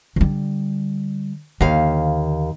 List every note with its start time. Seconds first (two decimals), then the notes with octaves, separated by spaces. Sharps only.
0.16 D3 G3
1.60 D#2 D3 F5